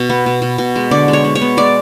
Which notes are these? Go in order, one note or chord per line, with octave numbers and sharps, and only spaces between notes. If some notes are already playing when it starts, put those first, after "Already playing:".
Already playing: B2
B3
B2
B2
B2
G#3
D3 D5
G#3
C#5
G#3
C#5
B3
G#3 D5